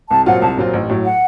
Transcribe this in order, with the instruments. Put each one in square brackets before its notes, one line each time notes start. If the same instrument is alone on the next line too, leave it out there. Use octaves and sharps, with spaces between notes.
[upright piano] C2 [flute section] A5
[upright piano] A#2 F#3 C4 F4 [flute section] F#5
[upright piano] C2 [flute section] A5
[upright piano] A#2 F#3 C4 F4
A1
A2 F#3
[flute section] F#5